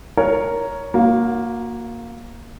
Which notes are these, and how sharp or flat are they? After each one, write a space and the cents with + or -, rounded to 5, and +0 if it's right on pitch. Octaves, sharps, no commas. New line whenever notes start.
A#4 +0 C#5 +5
A#3 +0 F#4 -30